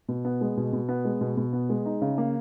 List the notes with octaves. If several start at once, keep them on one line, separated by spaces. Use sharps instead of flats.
B2
B3
G#3
B2
B2
B3
G#3
B2
B2
B3
G#3
D#4
C#3
A#3